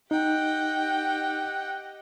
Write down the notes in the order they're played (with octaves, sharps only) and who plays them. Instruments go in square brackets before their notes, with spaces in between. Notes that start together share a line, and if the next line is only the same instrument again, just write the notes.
[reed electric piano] D#4 [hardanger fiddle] G4 D#5 [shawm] F#5 [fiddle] G5